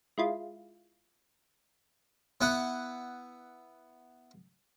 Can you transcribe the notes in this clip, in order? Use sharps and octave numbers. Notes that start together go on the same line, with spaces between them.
G#3 E4 F4
B3 E4 F#5